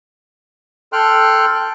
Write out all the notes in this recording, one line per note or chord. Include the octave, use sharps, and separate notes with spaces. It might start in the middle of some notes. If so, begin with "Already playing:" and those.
A4 G5 C6 F6 F#6